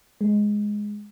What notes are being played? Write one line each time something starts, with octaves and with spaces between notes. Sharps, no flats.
G#3